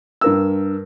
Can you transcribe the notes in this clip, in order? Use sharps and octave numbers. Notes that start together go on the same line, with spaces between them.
G2 A#4 E6